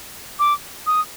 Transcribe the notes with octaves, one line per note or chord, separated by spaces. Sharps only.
D6
D#6